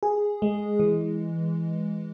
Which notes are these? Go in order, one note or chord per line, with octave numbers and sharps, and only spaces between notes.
G#4
G#3
E3